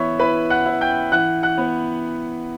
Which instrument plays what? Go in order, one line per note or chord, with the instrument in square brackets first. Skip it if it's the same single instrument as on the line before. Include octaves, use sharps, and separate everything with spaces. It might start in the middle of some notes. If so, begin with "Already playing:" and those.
Already playing: [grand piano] E3 B3 C#5 E5 C#6
E4 B4 B5
F#5 F#6
E4
G5 G6
E3 F#5 F#6
F#5 F#6
B3